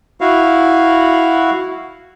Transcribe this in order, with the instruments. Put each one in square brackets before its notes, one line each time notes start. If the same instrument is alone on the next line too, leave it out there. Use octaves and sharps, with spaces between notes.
[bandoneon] E4 F#4 F5